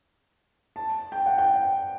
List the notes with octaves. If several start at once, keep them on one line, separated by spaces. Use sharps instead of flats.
A5
G5
F#5
G5